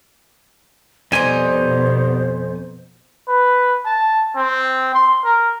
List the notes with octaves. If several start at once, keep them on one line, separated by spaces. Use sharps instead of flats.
F2 B2 G3 C4 D#4 C5 G#5
B4
A5
C4
C6
A#4